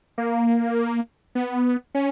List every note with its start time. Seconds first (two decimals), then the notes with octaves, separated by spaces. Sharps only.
0.18 A#3
1.35 B3
1.95 C#4